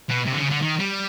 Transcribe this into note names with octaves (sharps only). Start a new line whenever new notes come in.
B2
C3
D3
C#3
D3
D#3
G3